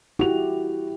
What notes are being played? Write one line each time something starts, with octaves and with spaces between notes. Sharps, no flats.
E4 F#4 G4 F7